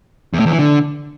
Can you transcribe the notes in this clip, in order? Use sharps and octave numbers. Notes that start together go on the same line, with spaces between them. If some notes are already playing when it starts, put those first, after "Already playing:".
E2
A2
E2
E3
D3